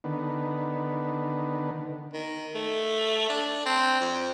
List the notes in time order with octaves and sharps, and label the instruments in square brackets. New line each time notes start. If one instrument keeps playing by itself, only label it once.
[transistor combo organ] D3 D#3 B3
[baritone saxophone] D#3
A3
D4
C4
F2